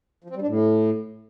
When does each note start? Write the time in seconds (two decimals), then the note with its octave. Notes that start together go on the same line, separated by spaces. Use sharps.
0.24 F3
0.30 C4
0.36 G3
0.41 D4
0.47 A2